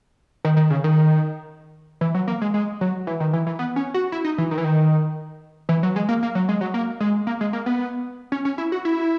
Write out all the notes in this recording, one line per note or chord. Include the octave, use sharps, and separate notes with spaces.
D#3
D#3
C#3
D#3
E3
F#3
A#3
G#3
G#3
F#3
E3
D#3
E3
E3
B3
C#4
F#4
E4
D#4
E3
D#3
E3
D#3
E3
F#3
G#3
A#3
A#3
F#3
G#3
F#3
A#3
G#3
A#3
G#3
A#3
B3
C#4
C#4
E4
F#4
E4